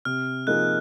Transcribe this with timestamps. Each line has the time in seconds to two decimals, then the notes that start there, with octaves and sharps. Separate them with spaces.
0.05 C3 F6
0.47 F3 A#3 D#4 G#4 F#6